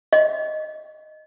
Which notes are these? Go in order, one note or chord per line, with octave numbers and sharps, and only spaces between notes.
D#5